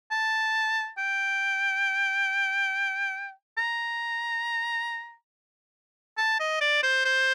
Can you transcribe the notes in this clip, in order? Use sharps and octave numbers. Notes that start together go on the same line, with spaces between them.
A5
G5
A#5
A5
D#5
D5
C5
C5